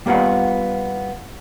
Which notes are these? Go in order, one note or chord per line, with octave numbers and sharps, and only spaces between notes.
G3 A#3 B3 F4 F#5